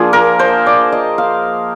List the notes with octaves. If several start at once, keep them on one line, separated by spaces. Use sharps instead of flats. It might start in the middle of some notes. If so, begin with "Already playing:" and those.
Already playing: F3 A#3 D4 G#4
A#4
C5
D5
D#5
F5